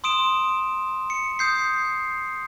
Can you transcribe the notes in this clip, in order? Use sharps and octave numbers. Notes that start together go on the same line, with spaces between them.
C6 D#6 D7 E7
C#7
D#6 G6 C7